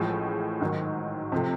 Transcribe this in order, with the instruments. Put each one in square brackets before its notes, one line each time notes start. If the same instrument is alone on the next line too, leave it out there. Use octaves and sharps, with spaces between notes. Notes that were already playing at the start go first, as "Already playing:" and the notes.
Already playing: [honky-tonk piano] A1 A2 F3 G#3
G#2 D#3 F#3
C3 F3 A3